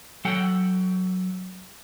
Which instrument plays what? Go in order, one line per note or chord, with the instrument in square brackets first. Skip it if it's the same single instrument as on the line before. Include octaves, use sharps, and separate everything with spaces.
[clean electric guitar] F#3 A4 F#5 G5